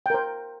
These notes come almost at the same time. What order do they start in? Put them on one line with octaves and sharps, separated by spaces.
G5 A#4 C5